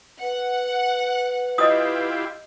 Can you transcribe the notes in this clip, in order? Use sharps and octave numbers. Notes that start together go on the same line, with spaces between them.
B4 F#5
E4 F4 G4 D#5 D#6